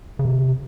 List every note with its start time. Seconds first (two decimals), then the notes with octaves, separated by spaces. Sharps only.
0.19 C#3
0.25 C3